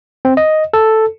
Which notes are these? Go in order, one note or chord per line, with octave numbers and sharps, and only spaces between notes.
C4
D#5
A4